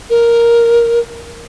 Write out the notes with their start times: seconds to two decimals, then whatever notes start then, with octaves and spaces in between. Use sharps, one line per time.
0.10 A#4